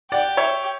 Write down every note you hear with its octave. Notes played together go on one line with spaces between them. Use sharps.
G4 D5 F#5
C#5 E5